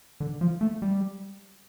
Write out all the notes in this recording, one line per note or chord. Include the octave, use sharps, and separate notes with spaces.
D3
F3
A3
G3